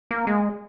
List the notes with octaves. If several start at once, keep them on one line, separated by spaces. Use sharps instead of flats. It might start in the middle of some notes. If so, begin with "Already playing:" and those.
A#3
G#3